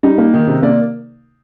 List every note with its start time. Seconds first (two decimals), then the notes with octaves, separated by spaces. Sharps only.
0.03 G3 D#4
0.18 A#3
0.34 D#3
0.47 C3
0.62 A#3 D5